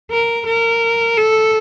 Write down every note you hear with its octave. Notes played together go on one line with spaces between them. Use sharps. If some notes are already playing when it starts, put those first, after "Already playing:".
A#4
A#4
A4